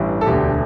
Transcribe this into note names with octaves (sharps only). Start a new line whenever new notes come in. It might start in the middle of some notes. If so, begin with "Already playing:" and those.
Already playing: A1 G2 E3
A4
E1 D2 D3 G4